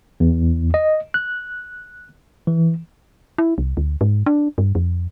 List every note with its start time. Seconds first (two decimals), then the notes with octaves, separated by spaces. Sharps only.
0.20 E2
0.74 D#5
1.14 F#6
2.47 E3
3.38 E4
3.58 C2
3.77 D2
4.01 G#2
4.26 D4
4.58 G2
4.75 F2